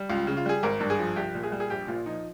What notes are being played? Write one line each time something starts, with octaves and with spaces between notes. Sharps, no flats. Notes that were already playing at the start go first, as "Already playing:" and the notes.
Already playing: G3
C#2 F4
C#3
F4
G3 G#4
G#1 A#4
G2
G#4
F3
C2 G4
A#2
G#4
G3
G#4
A#1 G4
A#2 F4
F3 D#4